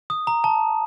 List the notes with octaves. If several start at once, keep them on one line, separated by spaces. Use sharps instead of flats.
D#6
A#5
A5